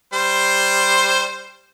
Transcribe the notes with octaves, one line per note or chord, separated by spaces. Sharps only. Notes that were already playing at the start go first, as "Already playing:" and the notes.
G3 C5 C6